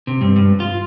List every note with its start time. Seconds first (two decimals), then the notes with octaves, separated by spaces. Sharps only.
0.07 C3
0.21 G2
0.36 G2
0.60 F4